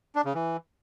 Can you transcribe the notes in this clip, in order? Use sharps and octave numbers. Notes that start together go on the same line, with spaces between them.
D4
C#3
E3